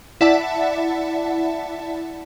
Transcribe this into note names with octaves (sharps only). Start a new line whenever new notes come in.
E4 D5 E5 F#5 A5